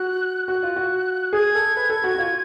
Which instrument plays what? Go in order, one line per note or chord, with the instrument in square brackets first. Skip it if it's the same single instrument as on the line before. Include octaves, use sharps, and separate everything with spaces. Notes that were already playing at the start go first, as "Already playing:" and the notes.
Already playing: [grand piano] F#4 [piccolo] F#6
[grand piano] F#4 [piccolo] F#6
[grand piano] F4
F#4
[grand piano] G#4 [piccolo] G#6
[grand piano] A4
B4
A4
F#4
F#4
F4